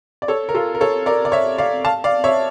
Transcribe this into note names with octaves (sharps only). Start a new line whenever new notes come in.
D5
A4 C#5
A#4
F4 A4
A#4
A4 C#5
A#4 D5
D5
C#5 E5
D5 F5
F5 A5
D5 F5
C#5 E5